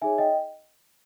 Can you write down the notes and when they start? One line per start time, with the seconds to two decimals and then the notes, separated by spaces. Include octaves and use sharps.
0.02 D#4 G#4 C#5 E5 G#5
0.18 D#5 G5